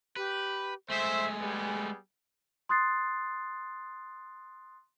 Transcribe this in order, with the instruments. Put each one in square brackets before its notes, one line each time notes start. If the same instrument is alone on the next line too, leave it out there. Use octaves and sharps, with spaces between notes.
[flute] G4 [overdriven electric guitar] B4
[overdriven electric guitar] G#3 A3 [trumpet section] C5 E5 [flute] G#5
[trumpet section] G3 B3 G#4
[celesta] C6 D#6 F#6 A6 C7